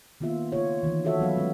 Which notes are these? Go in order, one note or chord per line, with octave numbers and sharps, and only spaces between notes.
D#3 A#3 B3 F4 E5
C#3 A3 F4 C#5
D#3 E3
F#4 A4 C#5 E5
F3 F#3 B3 B4 F5
G#3 A3 C#4